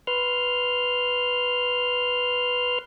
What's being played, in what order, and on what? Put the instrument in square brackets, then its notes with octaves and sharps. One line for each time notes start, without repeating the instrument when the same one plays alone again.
[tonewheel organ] B4 C6 F6